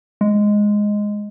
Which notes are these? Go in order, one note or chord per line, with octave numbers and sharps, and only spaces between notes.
G#3